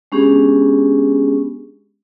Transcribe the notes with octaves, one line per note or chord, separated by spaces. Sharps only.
G#3 B3 C#4 D4 G4 G#4